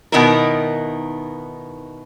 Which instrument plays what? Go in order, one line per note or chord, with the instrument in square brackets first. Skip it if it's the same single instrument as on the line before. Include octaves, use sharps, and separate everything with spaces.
[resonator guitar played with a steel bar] B2 D#3 B3 D#4 E4 A#4